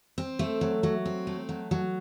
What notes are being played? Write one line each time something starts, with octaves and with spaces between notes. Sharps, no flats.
C4
A3
F#3
F#3
C4
A3
F#3
F#3